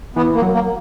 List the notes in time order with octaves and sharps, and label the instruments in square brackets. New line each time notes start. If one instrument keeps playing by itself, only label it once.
[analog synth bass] E3 [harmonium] B3
[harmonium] A#3
[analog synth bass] F#3
[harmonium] A#3